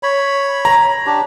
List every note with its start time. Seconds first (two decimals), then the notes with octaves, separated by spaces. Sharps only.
0.03 C#5 B5
0.65 A#5
1.06 D4 G4